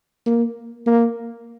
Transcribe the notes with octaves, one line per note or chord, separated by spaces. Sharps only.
A#3
A#3